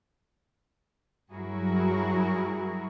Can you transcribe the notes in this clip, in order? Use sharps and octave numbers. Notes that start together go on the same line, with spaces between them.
G2 F#3 E4 F#4 G#4 A#4